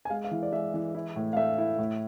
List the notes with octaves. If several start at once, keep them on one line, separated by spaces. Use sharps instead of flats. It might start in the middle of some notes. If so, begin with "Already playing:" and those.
G#5
G#3 F5
F5
E3
D5
G#3 E5
E3
E4
A2
F5
A3 E5
E4
A2